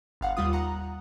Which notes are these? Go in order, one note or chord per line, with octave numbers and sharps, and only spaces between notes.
G1 F5 F#5
D#2 G3 F4 D#6
F#5 A#5